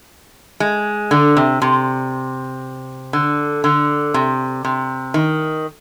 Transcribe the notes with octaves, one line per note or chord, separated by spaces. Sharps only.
G#3
D3
C3
C3
D3
D3
C3
C3
D#3